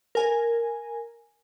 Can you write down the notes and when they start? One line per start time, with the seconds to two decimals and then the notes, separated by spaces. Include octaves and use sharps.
0.15 A#4 G#5